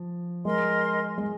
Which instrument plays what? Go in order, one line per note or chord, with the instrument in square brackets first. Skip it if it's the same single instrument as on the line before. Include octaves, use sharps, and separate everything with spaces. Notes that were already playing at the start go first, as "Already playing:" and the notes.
Already playing: [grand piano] F3
[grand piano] G#3 [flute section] A#4 D#5 C6
[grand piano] G#3